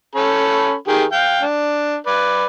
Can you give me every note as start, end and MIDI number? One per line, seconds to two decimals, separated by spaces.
0.15 0.74 61
0.15 0.74 69
0.15 0.74 83
0.88 1.04 51
0.88 1.04 67
0.88 1.04 68
1.12 1.41 77
1.12 1.41 79
1.42 1.96 62
2.07 2.47 71
2.07 2.47 74